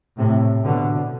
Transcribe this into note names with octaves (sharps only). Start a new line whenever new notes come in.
A2 C3
B2 D3